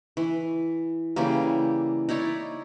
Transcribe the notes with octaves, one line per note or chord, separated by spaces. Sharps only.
E3
C#3 E3 G3 A#3
D#4 E4 C#5 D5